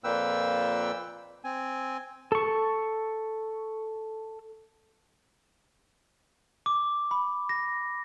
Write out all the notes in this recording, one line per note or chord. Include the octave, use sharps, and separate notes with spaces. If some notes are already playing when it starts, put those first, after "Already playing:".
F2 A#2 A#3 B4 G5 E6
C4 G#5
A4 C#6
D6
B5
A#6